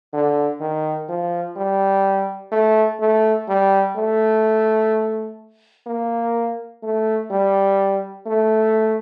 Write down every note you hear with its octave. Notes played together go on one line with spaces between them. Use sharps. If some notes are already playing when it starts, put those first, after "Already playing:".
D3
D#3
F3
G3
A3
A3
G3
A3
A#3
A3
G3
A3